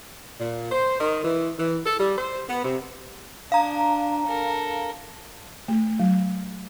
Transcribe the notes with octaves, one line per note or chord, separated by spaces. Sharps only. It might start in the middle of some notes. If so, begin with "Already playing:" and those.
A#2
C5
D#3
E3
E3
A4
G3
C5
B3
C3
D4 F5 A#5
A4 A#4
A3
F#3